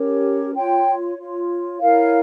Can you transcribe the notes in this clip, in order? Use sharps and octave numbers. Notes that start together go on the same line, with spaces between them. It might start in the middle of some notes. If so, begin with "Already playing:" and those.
Already playing: C#4 G4 A#4 C#5
F4 C#5 G5
F4 C#5
E4 A#4 C#5 F5